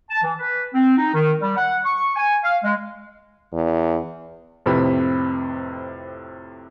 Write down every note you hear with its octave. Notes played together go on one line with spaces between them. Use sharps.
A5
E3
B4
C4
D#4
D#3
G3
F#5
C#6
G#5
F5
G#3
E2
F2 A2 C3 C4 B4 B5